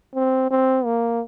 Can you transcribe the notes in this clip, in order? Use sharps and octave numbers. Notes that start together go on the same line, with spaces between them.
C4
C4
A#3